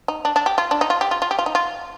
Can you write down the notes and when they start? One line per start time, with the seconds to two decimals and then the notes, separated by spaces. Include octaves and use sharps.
0.08 D#4
0.25 D4
0.36 D4
0.46 G4
0.58 F4
0.71 D4
0.81 D#4
0.90 F4
1.01 G4
1.11 F4
1.22 F4
1.31 G4
1.39 F4
1.46 D#4
1.55 F4